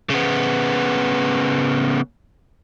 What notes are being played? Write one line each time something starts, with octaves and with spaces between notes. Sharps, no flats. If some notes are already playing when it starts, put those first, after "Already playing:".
C#3 B3